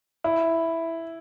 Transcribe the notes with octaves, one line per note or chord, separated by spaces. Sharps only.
E4